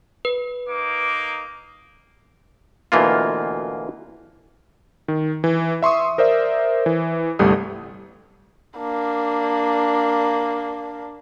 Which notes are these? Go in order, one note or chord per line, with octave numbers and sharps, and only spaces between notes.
B4
A#3 D#4 D6
D2 B2 E3 A#3 F4
D#3
E3
E5 C6 C#6 D#6
A#4 C5 D5 E5
E3
G1 C2 G3 A3 D#6
A#3 D4